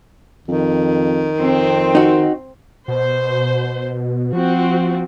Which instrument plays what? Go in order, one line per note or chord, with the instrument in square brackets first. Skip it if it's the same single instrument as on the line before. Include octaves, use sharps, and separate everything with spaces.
[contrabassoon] F2 [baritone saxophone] D#3
[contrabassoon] F2 [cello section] C4
[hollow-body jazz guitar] D#4 F#4
[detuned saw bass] B2 [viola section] C5
[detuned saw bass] F3 [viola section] C4 F#4